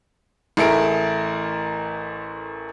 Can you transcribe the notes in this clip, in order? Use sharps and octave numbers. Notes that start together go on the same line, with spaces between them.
A1 A3 E4 G#4 A#4 D7